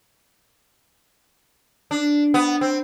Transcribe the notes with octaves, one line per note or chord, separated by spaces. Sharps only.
D4
B3
C4